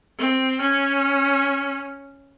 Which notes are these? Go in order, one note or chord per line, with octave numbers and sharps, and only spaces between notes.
C4
C#4